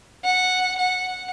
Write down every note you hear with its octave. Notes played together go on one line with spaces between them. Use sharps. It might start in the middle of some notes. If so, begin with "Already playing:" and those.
F#5
F#5